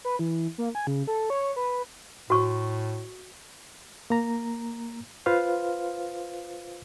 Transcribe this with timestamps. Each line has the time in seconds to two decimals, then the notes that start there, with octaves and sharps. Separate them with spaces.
0.05 B4
0.19 E3
0.58 A#3
0.75 G#5
0.87 C#3
1.07 A4
1.30 C#5
1.56 B4
2.30 A2 F#4 C#6
4.10 A#3 A#5
5.26 F4 B4 C5 F5